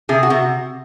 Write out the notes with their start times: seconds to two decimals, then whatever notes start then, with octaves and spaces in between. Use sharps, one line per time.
0.09 C3 G#4
0.23 F#4
0.30 C3